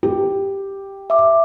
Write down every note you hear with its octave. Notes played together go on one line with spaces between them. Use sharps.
G4
E5 D6